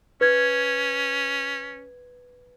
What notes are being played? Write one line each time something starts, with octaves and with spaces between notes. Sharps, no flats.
C#4 B4 G#6